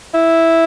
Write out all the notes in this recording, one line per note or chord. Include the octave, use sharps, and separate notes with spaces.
E4